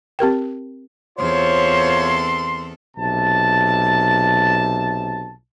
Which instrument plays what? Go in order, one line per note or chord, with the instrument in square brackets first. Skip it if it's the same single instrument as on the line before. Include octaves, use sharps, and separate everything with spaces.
[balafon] C4 G4 A#4 G5
[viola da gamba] E2 C4 A4 [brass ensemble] F4 C5 C#5 [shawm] C6
[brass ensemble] B1 C3 A5